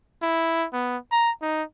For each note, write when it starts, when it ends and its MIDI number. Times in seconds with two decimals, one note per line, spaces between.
0.22 0.66 64
0.73 0.97 59
1.12 1.31 82
1.42 1.63 63